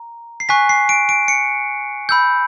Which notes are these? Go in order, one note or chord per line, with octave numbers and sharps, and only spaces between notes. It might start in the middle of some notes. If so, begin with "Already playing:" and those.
Already playing: A#5
C7
G#5 C#6 F#6 B6
C7
D7
D7
C#7
B5 E6 G6